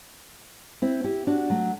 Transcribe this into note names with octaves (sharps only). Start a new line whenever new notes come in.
C4 E4
E4 G4
D4 F#4
F#3 A3